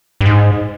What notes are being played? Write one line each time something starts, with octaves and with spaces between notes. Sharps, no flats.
G2
G#2